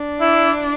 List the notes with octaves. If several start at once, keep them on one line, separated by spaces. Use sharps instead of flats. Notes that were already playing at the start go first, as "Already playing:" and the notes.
Already playing: D4
E4